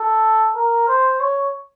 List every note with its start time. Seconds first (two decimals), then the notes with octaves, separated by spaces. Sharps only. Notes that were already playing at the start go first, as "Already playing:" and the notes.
Already playing: A4
0.56 A#4
0.88 C5
1.20 C#5